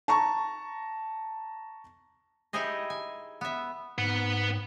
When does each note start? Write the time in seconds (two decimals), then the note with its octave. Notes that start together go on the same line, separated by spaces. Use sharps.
0.08 A5 A#5 C#6
2.53 D#4 E4 G4 G#4 C5 D#5
2.90 G#5
3.41 B3 E5
3.98 G#2 B4 F#5